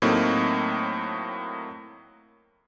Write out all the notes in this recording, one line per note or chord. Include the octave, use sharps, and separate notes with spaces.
A2 F#3 A3 A#3 C4 D#4